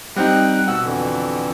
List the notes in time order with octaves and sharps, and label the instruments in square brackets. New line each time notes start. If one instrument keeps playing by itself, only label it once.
[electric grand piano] G3 C4 D#4 [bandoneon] F#5 G5 F#6
[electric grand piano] B2 F#5 [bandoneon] E6
[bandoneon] F2 D3 E3